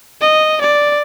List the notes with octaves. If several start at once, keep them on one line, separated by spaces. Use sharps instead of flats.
D#5
D5